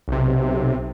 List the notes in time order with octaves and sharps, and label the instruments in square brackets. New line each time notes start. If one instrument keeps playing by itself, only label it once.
[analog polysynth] B1 C3